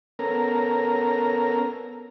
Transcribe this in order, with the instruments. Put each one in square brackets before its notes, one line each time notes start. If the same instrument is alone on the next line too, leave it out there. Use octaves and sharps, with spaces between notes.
[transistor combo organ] B3 C#4 A4 A#4 A#5